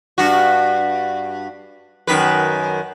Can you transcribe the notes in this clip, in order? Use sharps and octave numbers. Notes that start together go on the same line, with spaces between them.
G2 F#4
F#2 D#3 B4